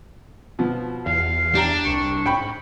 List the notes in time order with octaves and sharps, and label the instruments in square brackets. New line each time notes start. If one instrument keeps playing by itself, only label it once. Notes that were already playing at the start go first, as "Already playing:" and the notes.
[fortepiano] B2 F3
[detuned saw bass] E2 [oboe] F5
[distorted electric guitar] D4 [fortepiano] G4 A#5
[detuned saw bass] C2 [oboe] C#6
[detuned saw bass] G#2 [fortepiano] G5 B5